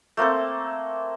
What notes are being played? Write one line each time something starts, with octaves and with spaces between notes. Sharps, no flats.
A3 A#3 C4 A4